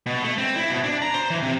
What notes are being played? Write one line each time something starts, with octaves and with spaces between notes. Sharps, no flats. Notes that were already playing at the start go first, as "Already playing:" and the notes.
B2
A3
C4
E4
B2
D4
A#5
C5
E3
C3